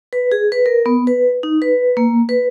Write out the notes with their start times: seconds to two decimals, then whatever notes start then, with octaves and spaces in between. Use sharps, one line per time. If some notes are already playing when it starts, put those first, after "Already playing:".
0.13 B4
0.32 G#4
0.52 B4
0.66 A#4
0.86 B3
1.07 B4
1.43 D#4
1.62 B4
1.97 A#3
2.29 B4